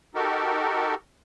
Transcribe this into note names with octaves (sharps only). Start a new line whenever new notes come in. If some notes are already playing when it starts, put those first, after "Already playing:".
D#4 F#4 G4 A4 A#4